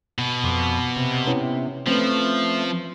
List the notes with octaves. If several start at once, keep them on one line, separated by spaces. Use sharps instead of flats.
B2
F2 C6 D6
C3
B3 C#4 E4
F3 A3 C4 C#4 B4